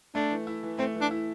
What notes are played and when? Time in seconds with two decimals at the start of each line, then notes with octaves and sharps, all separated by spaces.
0.15 A3 D4
0.31 E3
0.47 E4
0.63 E3
0.79 A3 C4
0.95 E3
1.01 D4
1.11 E4